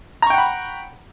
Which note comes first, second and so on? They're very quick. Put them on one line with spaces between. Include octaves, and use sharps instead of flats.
A#5 C#6 G5 F#5 B5